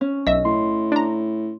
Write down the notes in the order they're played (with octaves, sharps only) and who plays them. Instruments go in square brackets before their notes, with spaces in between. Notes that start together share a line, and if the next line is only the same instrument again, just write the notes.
[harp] C#4
[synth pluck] B1 E5 [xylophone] D#5
[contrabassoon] A2 [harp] C6
[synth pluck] D4 A#5